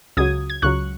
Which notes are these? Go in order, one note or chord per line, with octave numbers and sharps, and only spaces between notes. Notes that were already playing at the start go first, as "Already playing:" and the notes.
C#2 C#3 F#3 D#6 G#6
G#6
C#2 C#3 F#3 C#6 F#6